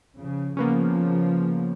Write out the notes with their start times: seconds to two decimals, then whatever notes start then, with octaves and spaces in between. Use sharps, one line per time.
0.17 C#3 F3
0.57 C#3 F3 A#3 B3 C#4